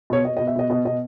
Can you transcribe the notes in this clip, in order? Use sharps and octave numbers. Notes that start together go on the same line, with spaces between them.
B2 C#5
B2 D#5
B2 D#5
E5
B2 D#5
B2 D#5
B2 D#5